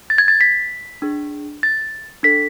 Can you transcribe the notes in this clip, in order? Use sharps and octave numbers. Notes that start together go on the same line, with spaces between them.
A6
G#6
A6
B6
D4 G#4
A6
D4 A4 B6